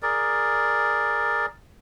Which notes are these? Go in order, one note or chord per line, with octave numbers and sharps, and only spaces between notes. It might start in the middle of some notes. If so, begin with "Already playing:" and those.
G#4 A#4 D5